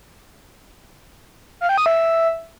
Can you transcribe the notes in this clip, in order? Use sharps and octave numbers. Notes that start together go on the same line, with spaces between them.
F5
G5
D#6
E5